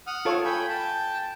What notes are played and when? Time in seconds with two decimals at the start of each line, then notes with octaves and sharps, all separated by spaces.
0.07 F#5 D#6 F6
0.25 F4 A4 C#5
0.45 G5 G#5 B5
0.70 G5 A5